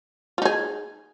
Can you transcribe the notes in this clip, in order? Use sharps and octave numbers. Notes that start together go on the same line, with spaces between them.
D#4 F4 G#4